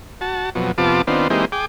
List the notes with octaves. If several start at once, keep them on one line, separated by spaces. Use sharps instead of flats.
F#4 A5
F2 B2 F#3
F2 C3 B3 F4 A5 D6
D#3 B3 C4 D4 F4
E3 G#3 A#3 C4 D#4 G4
G#4 G5 D6